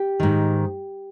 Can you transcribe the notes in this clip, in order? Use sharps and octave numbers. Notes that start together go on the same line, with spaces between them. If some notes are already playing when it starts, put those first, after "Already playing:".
Already playing: G4
G#2 D#3